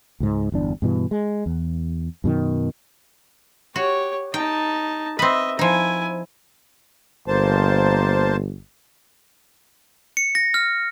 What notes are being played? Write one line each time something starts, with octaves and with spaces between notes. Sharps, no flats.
C#2 G#2
G1 E2 D4
G2 B2 E3
G#3
E2
F#2 B2 D#3
F#4 G4 C#5
D#4 G5 A5
C4 B4 D#5 E5
F3 D#4 E4 G#5
G1 A#3 C5 A5
C#7
A#6
F6